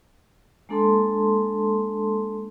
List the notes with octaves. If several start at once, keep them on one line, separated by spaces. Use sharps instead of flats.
G#3 A#3 D4 A4 A5 C6